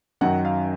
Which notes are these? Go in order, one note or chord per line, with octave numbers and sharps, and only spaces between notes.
F#2 D#3 F#3 F#5
F5